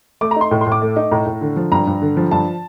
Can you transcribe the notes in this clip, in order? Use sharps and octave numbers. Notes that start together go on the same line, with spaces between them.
A3 D6
A#5
D#4 C6
A2
C6
A2
D6
A3
D#4
A2 A#5
A2
D3
F3
G2 A#5
G2
D3
F3
G2 A5